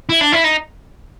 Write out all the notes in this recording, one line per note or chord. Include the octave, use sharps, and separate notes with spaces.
E4
D4
E4
D#4